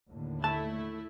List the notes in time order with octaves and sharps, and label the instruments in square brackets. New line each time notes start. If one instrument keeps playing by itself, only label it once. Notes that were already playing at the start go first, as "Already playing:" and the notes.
[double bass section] D#2 A2 D3
[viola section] A3 E4 [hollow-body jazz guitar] A5